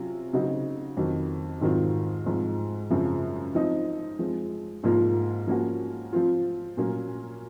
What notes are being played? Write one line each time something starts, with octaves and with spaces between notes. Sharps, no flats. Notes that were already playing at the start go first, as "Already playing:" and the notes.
Already playing: C3 F#3 C#4 F4
C#3 F#3 C4 D#4 F#4
F2 D#3 F#3
G#2 D#3 F#3 C4 F4
G#2 F3 C4
F#2 C#3 F3 C4
F3 C4 D#4
F3 G#3 C4
G#2 F3 A#3 F4
F3 A#3 C#4 F#4
F3 C4 F4
A#2 F#3 A#3 C#4